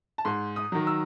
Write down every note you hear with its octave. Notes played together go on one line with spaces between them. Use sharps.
A5
G#2 C6
D#6
D#3 F#3
E6